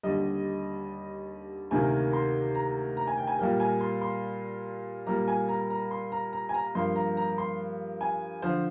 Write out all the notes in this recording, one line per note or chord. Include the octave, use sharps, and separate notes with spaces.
D#2 D3 G3 D#5
D2 C3 D#3 A#3 G#5
C6
A#5
A#5
G#5
G5
G#5
A#2 G3 A#3 G5
G#5
C6
C6
A#2 G3 A#3 A#5
G#5
A#5
A#5
C6
A#5
A#5
G#5
A#5
G2 F3 A#3 C6
A#5
A#5
C6
G#5
D3 F3 C5